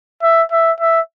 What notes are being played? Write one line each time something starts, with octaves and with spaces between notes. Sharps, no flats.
E5
E5
E5